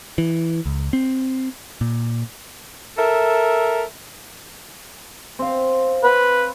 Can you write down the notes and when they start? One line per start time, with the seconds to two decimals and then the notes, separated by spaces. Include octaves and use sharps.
0.18 E3
0.66 C#2
0.93 C4
1.81 A#2
2.97 A4 A#4 E5
5.39 C4 F5
6.04 B4